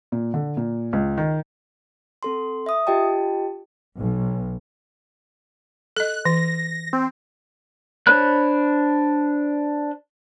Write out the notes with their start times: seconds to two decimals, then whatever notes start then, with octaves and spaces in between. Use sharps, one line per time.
0.12 A#2
0.34 D3
0.57 A#2
0.93 C#2
1.18 D#3
2.23 C4 A4 C6
2.66 E5 D#6
2.87 F4 G4 D#5 G5 A5
3.97 B1
5.97 A4 D#5 F#6
6.25 E3 A#6
6.93 C4
8.07 D4 C5 C#5 B5 F#6